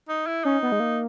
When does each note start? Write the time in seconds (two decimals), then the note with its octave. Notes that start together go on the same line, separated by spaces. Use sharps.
0.09 D#4
0.27 E4
0.45 C#4 D#4
0.63 B3
0.72 G#3
0.80 A#3